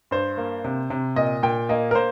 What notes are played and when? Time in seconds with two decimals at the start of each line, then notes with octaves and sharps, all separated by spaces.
0.11 G2 C5
0.38 A#3
0.64 C3
0.90 C3
1.16 A#2 D#5
1.43 A#2 G5
1.69 A#3 D#5
1.91 A#4
1.95 A#3 C5